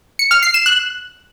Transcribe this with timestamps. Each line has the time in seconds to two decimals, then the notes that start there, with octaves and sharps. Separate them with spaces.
0.19 C#7
0.31 F6
0.43 C7
0.54 E7
0.66 F#6